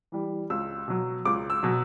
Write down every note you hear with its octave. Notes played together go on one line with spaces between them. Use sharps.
E3 G3
C#2 E6
B2 F#3
C#2 D6
E6
B2 F#3